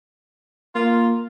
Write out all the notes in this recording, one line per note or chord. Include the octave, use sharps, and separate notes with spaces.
A#3 F4